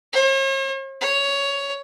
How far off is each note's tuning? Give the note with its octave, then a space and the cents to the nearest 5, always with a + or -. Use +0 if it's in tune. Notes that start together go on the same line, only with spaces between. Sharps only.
C#5 -45
C#5 +10